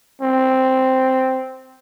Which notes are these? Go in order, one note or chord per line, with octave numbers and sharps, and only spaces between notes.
C4